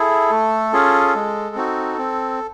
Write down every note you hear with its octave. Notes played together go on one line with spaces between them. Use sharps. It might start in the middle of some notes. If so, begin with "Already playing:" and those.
Already playing: E4 G#4 A4
A3
C#4 F4 G#4
G#3
C4 D#4 F#4
C4